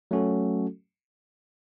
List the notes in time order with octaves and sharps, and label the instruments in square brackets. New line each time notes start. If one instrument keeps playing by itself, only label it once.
[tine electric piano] F#3 A3 C#4 F#4 A4